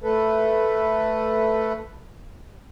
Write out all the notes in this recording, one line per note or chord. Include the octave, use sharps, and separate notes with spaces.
A3 A4 B4